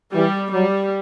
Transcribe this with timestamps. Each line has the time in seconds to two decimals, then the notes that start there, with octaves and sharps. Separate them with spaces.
0.14 E3 G3
0.53 F#3 G3